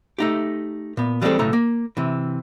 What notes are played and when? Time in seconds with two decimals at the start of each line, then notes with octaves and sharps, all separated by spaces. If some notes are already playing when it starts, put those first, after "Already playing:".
0.18 A3 D#4 G4
0.97 A#2 B3
1.21 E3 G3 G#3 A#3 C4 A4
1.39 B1 A2 C#3 A4 A#5
1.53 A#3
1.97 C3 E3